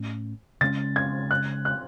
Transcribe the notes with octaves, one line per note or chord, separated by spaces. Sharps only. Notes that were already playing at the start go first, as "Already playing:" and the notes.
Already playing: A2 A3 C#4
C#3 G#3 C#4 A6
G#6
F#6
F#6